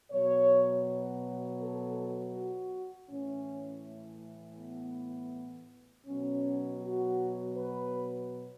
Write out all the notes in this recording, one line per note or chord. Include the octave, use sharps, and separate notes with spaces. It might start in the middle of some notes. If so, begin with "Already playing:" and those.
B2 F#3 C#5
A4
F#4
A2 E3 C#4
A3
B3
B2 F#3 C#4
F#4
B4